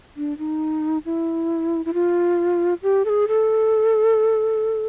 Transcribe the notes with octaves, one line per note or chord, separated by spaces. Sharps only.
D4
D#4
E4
E4
F4
G4
A4
G#4
A4